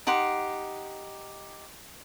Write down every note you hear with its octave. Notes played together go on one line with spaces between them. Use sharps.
D#4 G4 F#5 C6